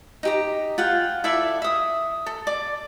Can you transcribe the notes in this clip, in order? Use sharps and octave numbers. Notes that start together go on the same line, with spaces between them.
D#4 G4 A#5
F4 F#5 G5
E4 A4 D5 E5
E5 D#6
A4
D5 D6